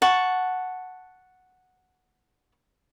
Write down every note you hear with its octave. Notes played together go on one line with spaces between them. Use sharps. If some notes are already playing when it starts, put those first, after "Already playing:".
F#5 A5 C#6